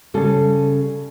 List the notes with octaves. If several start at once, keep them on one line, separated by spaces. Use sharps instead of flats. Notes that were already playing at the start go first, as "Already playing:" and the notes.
C#3 G3 A4